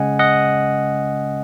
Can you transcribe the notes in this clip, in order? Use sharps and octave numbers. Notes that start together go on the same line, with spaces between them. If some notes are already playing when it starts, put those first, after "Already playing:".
Already playing: C#3 G#3 C#4 D#5 F#5 G#5
D#5 F#5